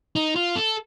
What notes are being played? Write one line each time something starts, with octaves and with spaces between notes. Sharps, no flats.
D#4
F4
A4